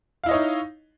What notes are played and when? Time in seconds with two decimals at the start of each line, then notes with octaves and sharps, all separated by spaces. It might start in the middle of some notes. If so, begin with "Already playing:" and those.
0.24 F5
0.26 E4
0.29 D#5
0.31 C#5
0.34 D#4